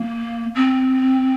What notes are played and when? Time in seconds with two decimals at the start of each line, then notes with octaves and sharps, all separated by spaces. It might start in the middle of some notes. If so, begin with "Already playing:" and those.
Already playing: A#3
0.55 C4